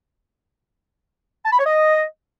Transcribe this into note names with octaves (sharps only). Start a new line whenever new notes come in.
A5
B5
C#5
D#5